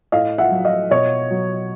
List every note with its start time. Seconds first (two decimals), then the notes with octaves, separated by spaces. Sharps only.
0.12 A2 D#5 F5
0.38 E5 F#5
0.51 F#3
0.65 D#5 F5
0.91 B2 C#5 D#5
1.31 F#3